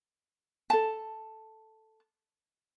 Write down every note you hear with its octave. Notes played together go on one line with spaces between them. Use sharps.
A4 A5